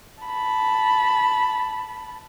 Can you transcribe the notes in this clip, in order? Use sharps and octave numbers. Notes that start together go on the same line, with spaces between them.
A5 B5